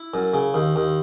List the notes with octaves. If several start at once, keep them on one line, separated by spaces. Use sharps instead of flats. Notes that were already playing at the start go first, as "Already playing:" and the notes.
Already playing: E4
F#2
C#3
D#2
D#2